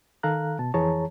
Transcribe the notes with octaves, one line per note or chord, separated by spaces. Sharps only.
D#3 A4 F5 A#5 F#6
B2 A5
F2 E3 G#4 C#5 A5 A#5